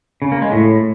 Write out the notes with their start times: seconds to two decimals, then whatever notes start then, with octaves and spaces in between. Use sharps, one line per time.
0.22 C#3
0.32 A#3
0.42 G#3
0.52 A2